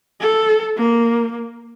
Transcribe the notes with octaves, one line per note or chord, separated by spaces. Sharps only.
A4
A#3